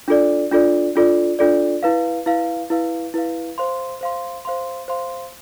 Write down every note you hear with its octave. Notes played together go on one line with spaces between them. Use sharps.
D4 F4 A4 D5
D4 F4 A4 D5
D4 F4 A4 D5
D4 F4 A4 D5
E4 B4 F5
E4 B4 F5
E4 B4 F5
E4 B4 F5
C5 F5 C6
C5 F5 C6
C5 F5 C6
C5 F5 C6